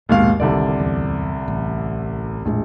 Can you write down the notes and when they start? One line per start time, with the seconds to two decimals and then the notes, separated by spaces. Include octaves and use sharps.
0.09 A#1 D#2 G#2 B2 C4 F5
0.40 F1 C2 D3 D#3 D5
0.78 D1 E2
1.48 A1
2.45 A#1 E2 A2 G#3